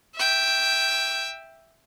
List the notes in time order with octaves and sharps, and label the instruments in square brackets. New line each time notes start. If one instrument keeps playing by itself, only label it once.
[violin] E5 G5